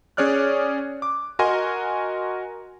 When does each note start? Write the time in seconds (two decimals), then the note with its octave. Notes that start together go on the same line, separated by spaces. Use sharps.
0.17 C#4 G#4 C#5 D5 F6 F#6
1.02 D6
1.39 F#4 A#4 D#5 G#5 C6